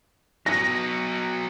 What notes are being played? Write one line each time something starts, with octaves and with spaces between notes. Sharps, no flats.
F#3 B3 A#6